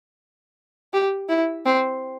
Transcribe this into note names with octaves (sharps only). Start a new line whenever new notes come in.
G4
E4
C4